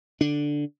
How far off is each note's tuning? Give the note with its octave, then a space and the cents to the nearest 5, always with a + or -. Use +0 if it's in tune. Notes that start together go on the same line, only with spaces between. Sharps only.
D3 +0 D4 +0